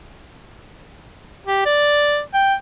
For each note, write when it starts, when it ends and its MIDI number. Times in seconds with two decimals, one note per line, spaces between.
1.47 1.61 67
1.66 2.20 74
2.34 2.55 79